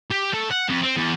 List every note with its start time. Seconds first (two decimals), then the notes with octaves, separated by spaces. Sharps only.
0.11 G4
0.33 A3
0.51 F#5
0.69 F2
0.83 C4
0.97 E2